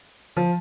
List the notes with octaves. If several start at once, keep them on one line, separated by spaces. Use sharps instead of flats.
F3